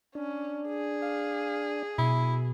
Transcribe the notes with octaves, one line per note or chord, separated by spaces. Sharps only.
C#4 D4
G#4
F5
B2 E4